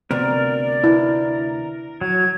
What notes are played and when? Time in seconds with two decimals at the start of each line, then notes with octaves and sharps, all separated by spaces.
0.11 D2 C3 B3 C4 A#4 D5
0.84 E4
2.01 F#3 G#6